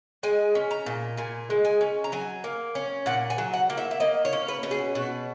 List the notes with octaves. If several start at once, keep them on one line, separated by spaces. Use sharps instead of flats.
G#3 G#5
C#4
A#5
A#2
A#2 G#5
G#3
G#5
C#4
A#5
F#3 G#5
A#3
C#4
A#2 F#5
G#5
F#3
F#5
A#3
E5
E5
A#3 D#5
C#5
C#4
B4
B2
G#4
B2 F#4